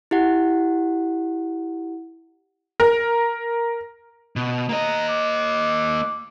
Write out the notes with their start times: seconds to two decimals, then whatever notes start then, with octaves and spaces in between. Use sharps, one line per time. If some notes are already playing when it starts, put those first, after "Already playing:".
0.11 E4 G4 F#5
2.80 A#4
4.36 B2
4.69 A#3 D#5 A#5
5.09 D6